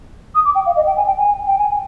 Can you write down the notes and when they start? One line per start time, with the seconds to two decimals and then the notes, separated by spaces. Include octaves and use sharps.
0.35 D#6
0.45 D6
0.55 G5
0.66 F5
0.76 D#5
0.87 G5
0.97 G#5
1.07 G5
1.18 G#5
1.47 G5
1.59 G#5